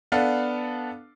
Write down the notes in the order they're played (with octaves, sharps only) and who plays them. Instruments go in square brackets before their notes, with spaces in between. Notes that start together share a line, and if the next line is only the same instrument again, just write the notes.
[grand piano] B3 D4 A4 F5 F#5